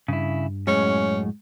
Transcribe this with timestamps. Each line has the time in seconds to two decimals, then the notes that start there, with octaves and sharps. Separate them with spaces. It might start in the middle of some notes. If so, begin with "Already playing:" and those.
0.08 G2 C#3 E4
0.67 F#2 A2 G#3 C#4